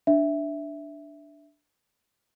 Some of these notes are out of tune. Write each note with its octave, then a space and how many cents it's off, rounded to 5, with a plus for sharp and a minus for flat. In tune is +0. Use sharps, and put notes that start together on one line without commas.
D4 +0 E5 +0